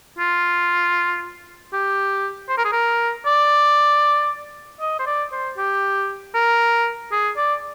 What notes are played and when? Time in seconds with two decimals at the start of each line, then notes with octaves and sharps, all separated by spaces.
0.19 F4
1.73 G4
2.49 C5
2.58 A#4
2.65 G#4
2.73 A#4
3.26 D5
4.81 D#5
4.99 C5
5.07 D5
5.32 C5
5.58 G4
6.35 A#4
7.12 G#4
7.37 D5